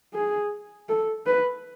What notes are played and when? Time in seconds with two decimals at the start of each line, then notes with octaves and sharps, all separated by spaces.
0.14 G#4
0.89 A4
1.26 B4